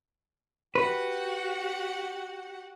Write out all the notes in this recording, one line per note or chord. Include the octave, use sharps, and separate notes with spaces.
F#4 G4 B4 F#5